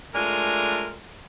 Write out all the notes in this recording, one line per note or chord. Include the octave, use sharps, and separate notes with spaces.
G#3 A3 D4 F4 A#4 G#5